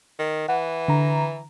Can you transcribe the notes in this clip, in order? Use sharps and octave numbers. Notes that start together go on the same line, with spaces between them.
D#3
E3 F#5
D3 A#5